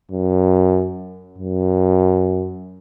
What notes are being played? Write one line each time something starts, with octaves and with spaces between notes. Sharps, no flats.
F#2
F#2